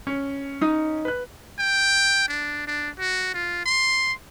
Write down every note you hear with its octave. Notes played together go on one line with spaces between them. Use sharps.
C#4
D#4
B4 F#6
G5
D4
D4
F#4
F4
C6